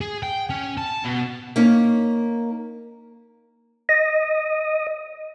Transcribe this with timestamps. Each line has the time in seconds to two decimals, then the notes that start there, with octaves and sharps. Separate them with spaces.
0.01 G#4
0.23 G5
0.50 C#4
0.78 A5
1.05 B2
1.56 A#3 C#4 D#4
3.89 D#5